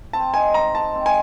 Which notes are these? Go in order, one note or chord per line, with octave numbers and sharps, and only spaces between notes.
C4 A5
D#4 G#5
G#3 A#5
G#3 A5
C4
G#5